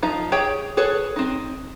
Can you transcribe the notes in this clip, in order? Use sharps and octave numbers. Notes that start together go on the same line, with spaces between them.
F3 D#4 F5 A#5
G4 G#4 C#5 G5
G#4 A4 B4 C#5
C4 D#4